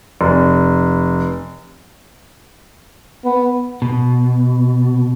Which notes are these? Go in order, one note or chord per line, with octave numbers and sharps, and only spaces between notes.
F1
B3
B2